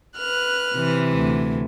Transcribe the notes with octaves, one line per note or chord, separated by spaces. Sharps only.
B4 F6 F#6
C3 E3
D2